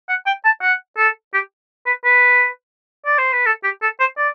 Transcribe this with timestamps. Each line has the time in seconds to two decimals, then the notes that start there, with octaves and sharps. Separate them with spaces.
0.09 F#5
0.26 G5
0.45 A5
0.62 F#5
0.97 A4
1.34 G4
1.86 B4
2.05 B4
3.06 D5
3.18 C5
3.33 B4
3.46 A4
3.64 G4
3.82 A4
4.00 C5
4.17 D5